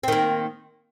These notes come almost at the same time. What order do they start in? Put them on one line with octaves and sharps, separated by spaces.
C4 D#3 A#3